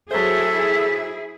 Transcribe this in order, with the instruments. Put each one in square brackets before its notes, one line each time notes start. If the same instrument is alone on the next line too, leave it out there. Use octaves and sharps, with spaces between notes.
[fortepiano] F#3 C5 [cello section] E4 G#4 [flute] A4 [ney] E5